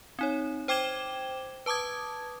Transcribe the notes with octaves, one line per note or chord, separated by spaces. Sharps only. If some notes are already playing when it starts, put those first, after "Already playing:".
C4 D#4 C#5
C5 G5 D6 G#6 E7 G7
B4 A5 D6 D#6 G#6